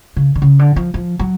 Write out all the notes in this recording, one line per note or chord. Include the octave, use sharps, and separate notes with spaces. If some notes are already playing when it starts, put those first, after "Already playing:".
C#3
D3
C#3
D3
F3
F3
F#3